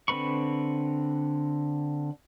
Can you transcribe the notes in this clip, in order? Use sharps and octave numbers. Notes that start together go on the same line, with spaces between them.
D3 C4 B4 B5 C#6